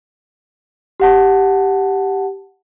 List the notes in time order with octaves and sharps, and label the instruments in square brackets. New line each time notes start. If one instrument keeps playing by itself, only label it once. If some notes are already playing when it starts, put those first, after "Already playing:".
[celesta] G4 F#5 A5